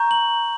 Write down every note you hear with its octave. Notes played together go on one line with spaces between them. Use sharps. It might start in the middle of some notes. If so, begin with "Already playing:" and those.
Already playing: A#5 C#6 G6
F#7